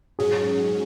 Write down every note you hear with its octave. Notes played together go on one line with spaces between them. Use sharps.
G#2 F#3 C#4 G#4